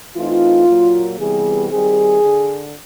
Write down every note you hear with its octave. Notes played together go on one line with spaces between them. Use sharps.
E3 A3 C4 D#4 F4
A#2 F#3 A#3
C3 E3 G3 B3 G#4
D#3 G3 C4 G#4
D3